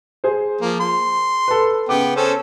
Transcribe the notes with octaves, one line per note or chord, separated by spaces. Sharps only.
G#4 C5
F3 A#3
C6
A4 B4
C#3 B3 G5 D6
C#4 A4 C5